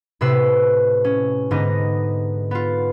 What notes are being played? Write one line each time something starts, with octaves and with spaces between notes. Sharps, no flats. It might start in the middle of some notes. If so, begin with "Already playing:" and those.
A2 C3 B4 E6 C7
C#4
G#2 D3 B3 D#4 A#6
B3 F4